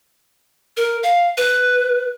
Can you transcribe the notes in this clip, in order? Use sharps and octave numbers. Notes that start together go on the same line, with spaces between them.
A#4
F5
B4